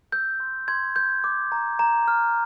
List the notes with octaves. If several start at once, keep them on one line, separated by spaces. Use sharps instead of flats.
E6 G6
C6
C6 G#6
G6
D6
A#5
A#5
F6